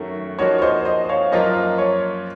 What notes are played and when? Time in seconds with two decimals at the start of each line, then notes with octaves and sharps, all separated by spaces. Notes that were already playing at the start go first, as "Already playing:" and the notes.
Already playing: F#2 D#3 A3 C#4 F#4
0.39 F3 A#3 D#4 F#4 C#5
0.59 C#5
0.62 C5 D#5
0.85 C5 D#5
1.04 D#5
1.09 C#5 F5
1.32 F#2 F3 A#3 F4 C5 D#5
1.78 C#5